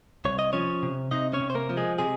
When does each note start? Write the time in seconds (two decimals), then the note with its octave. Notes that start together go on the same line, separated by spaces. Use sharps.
0.25 C2 C#5
0.39 D#5
0.53 F3 C#4 C#5
0.83 C3
1.11 C3 D#4 D#5
1.33 C#4 C#5
1.41 C3
1.50 C5
1.55 A#3 A#4
1.70 F3
1.77 G#3 G#4
1.98 C3 G#3 G#4